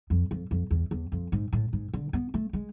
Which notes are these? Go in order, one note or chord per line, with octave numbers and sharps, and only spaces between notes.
F2
F2
F2
E2
E2
F2
G#2
A2
G#2
D3
B3
A3
G#3